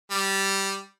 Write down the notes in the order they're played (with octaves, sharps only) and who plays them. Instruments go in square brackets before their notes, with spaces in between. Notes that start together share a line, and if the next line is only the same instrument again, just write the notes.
[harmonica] G3